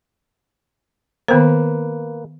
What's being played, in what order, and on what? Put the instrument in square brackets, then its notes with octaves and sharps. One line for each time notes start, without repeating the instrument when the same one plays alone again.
[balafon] D#3 B3 C5 [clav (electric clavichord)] A#3 B4